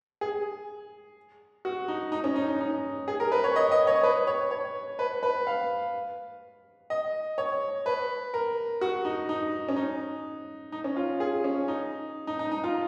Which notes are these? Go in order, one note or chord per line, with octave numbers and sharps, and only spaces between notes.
G#4
F#4
D#4
D#4
C#4
D#4
D#4
D#4
G#4
A#4
B4
C#5
D#5
D#5
C#5
B4
C#5
C#5
B4
B4
F5
D#5
C#5
B4
A#4
F#4
D#4
D#4
C#4
D#4
D#4
C#4
F4
G#4
C#4
D#4
D#4
D#4
D#4
F4